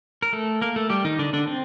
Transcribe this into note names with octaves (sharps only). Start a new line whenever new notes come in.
A#4
A3 A4
A#3 A#4
A3 A4
G3 G4
D#3 D#4
D3 D4
D3 D4
C4